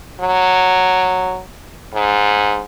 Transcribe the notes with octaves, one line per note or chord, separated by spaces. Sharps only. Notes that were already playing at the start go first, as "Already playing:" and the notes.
F#3
G#2